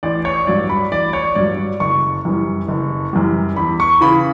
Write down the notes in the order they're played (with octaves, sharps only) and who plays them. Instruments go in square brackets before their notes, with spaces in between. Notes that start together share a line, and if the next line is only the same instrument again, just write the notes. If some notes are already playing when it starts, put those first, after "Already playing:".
[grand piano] A1 D5
C#5
G2 F#3 D5
B5
A1 D5
C#5
G2 F#3 D5
F#1 C#6
F#2 E3 G3
F#1
F#2 E3 G3
E2 B5
C#6
C#3 E3 B5